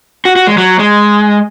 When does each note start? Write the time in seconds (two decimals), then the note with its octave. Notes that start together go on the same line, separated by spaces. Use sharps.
0.25 F#4
0.36 F#4
0.47 G#3
0.58 F#3
0.79 G#3